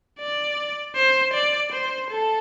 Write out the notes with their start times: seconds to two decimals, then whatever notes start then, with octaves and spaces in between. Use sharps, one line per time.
0.19 D5
0.95 C5
1.33 D5
1.72 C5
2.10 A4